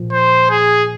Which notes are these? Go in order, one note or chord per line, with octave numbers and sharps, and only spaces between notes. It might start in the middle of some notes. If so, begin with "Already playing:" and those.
Already playing: A#2 F3
C5
G#4